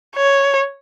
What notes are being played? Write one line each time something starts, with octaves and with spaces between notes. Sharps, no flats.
C#5